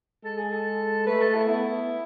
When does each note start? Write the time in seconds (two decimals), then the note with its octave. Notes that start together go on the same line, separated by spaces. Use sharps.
0.24 G#3 A4
0.38 G#4
0.52 A4
1.07 A3 B4
1.22 A4
1.35 E4
1.48 B3 E4